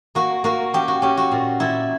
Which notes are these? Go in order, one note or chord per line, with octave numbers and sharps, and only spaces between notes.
A#3 F#4
A#3 F#4
C#4 G4
F#4
C#4 G4
F#4
A#2
A#2 E4